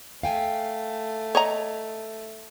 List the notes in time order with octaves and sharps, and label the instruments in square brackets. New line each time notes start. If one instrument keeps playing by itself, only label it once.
[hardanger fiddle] A3 [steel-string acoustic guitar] F5 G5 G#5
[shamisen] C#5 D#5 A#5